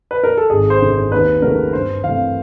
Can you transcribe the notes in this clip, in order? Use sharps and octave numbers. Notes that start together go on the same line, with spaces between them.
B4
A#4
A4
G#1 G#4
C5
F#2 D3
C5
D#2 B4
C#3 F#3 A3 C#4 A#4
G2 C5
E3 A3 C4 F5